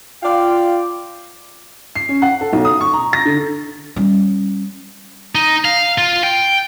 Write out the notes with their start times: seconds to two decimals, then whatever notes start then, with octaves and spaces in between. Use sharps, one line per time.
0.23 F4 D5 F5 G5
1.95 C7
2.09 C#4
2.22 F#5
2.41 A4
2.53 B1
2.65 D#6
2.81 C#6
2.93 A#5
3.13 A#6
3.25 D3
3.96 G3 C#4
5.35 D#4
5.65 F5
5.98 F4
6.23 G5